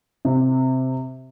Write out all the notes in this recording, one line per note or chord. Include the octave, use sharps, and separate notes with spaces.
C3